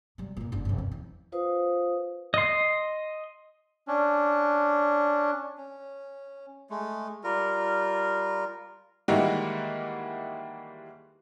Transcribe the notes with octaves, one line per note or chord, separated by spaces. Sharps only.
F#3 G3
F#2 A#2
F#1 D3
E1 F#2
C#3
E3
F4 B4 C5 F5 D#6
D#5 C6
C#4 D4
C#4
G#3 A3
G3 F4 A#4
D#3 E3 G3 G#3 A#3 F#4